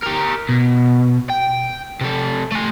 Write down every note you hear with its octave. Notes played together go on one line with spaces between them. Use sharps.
G4 A#4
B2
G5
C3 A4
A3 G#5